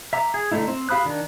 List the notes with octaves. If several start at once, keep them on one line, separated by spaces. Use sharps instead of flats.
E5 A#5 D6
G#4
D3 A3 A#3 D#4 E4
C4
G4 F5 B5 D#6 F#6
D#3 D4